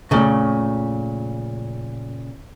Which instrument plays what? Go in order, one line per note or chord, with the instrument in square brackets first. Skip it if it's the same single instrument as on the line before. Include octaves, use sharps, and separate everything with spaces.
[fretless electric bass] F2 A3 [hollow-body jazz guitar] A#2 C#3